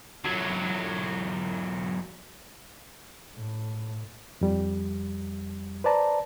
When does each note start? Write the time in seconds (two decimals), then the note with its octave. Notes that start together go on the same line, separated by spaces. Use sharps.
0.24 E2 F#3
3.36 A2
4.41 F2 G3
5.84 B4 C5 D5 A5 A#5